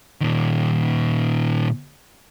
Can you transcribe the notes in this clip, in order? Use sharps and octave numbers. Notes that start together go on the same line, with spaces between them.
A#2 D#3